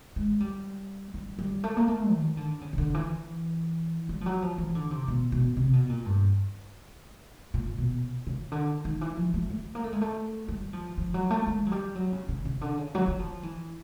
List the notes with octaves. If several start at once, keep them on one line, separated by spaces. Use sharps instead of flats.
G#3
G3
G3
G3
A3
A#3
A3
D#3
D3
C#3
C#3
D3
E3
G3
F3
F#3
F3
E3
D3
C3
B2
B2
C3
B2
A#2
G2
A#2
B2
C#3
D3
D#3
E3
F3
A3
A3
A#3
A3
G#3
A3
G3
F3
F3
F#3
A3
G#3
F#3
G3
F#3
C#3
C#3
C#3
D3
C#3
F#3
F#3
F3
E3